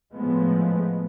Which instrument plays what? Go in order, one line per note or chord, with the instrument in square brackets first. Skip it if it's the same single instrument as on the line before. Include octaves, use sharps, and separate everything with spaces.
[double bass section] A2 F3 G#3 B3